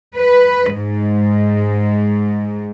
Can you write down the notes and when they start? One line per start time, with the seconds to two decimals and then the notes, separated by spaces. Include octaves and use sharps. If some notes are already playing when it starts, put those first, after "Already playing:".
0.16 B4
0.75 G#2